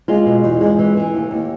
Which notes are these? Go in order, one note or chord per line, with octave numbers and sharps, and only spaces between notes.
G#3 F4
B2
E2
G#3
E3
E3
D#2
D#2